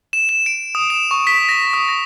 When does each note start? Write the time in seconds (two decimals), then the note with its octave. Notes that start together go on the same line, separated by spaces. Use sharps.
0.13 E7
0.29 E7
0.46 D7
0.75 D#6
0.90 E7
1.11 C#6
1.27 B6
1.49 A#6
1.73 D#6
1.89 A#6